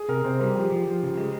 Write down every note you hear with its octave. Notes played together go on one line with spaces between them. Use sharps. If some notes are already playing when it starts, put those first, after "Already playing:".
Already playing: G#4
C3 A#4
C3 C5
G3 A#4
F3 G4
F3
F3
C#3
G#3